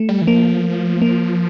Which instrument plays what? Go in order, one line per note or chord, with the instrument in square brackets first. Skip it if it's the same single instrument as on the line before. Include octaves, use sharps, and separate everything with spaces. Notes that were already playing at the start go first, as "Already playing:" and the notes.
Already playing: [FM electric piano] A3
[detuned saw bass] G3
E3
[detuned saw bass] F3 [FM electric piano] A#3
[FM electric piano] A#3